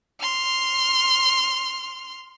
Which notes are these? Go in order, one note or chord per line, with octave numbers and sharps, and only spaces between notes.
C6 F6